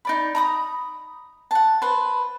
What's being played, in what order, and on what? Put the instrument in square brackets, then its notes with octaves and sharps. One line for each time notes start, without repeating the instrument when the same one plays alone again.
[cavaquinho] D#4 D5 B5
A#5 B5 D#6
F#5 A5
B4 C5